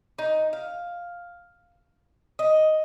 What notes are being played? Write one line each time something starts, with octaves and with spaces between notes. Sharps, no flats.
D#4
F5
D#5